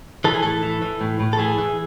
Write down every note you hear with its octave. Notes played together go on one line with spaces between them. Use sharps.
E3 A4
G#4
A2 A4
E3
E3
A2
A2
A4
E3 G#4
E3